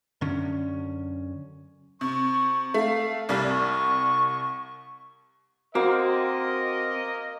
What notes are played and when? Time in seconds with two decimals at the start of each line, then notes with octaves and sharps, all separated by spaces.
0.21 F#2 D3 C#4
2.01 C3 C#6
2.74 A3 F5
3.29 C2 G3 D5
3.49 C#6
5.75 A#3 C4 F#4 A#4 D#5